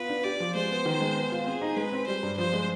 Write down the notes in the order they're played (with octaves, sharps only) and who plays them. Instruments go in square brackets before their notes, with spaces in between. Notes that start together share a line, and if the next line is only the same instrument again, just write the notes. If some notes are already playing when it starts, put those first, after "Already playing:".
Already playing: [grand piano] B3 F4 [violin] B4
[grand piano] D4
[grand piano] G4 [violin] D5
[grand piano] F3
[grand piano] G#3 [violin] C5
[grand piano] B3
D#3
G#3
B3
F4
[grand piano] C4 [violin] G#4
[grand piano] D#4
[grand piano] G#3 [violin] B4
[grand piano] C4
[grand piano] G3 [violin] C5
[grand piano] G2
[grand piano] F3 [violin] C5
[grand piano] G#3